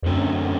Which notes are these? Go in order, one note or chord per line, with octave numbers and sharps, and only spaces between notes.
E2
F#2 D3 A3 C4